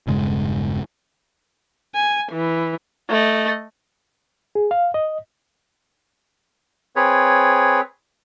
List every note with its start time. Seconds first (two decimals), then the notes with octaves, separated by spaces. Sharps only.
0.07 E1 G2 C#3 G#3
1.95 G#5
2.31 E3
3.10 A3 D#5
4.55 G#4
4.71 F5
4.94 D#5
6.96 C4 G#4 B4 C#5